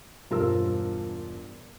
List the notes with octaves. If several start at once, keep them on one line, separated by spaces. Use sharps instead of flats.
E1 G2 F4 A#4 C5 E6